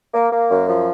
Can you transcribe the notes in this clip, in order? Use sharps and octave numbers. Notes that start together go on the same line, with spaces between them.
A#3
A#3
F#2
F3